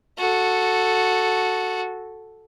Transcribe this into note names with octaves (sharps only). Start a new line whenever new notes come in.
F#4 A4